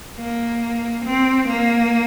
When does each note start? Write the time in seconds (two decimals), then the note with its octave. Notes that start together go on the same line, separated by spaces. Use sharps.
0.18 A#3
1.05 C4
1.48 A#3